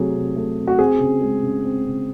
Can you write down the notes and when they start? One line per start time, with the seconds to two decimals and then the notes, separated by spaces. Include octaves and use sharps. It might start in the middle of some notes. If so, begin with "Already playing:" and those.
Already playing: C3 F#3 A3 G#4
0.15 C3
0.36 A3
0.58 C3
0.68 F#4
0.79 C4 G#4
1.00 C#3
1.21 G#3
1.43 C#3
1.65 C4
1.86 C#3